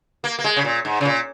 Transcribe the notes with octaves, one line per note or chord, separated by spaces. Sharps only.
A#3
A#3
G#3
C#3
A#2
G#2
C#3
A#2